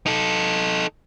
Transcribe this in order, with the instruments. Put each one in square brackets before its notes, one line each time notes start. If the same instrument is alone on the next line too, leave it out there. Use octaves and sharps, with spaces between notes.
[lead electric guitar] D#4 A4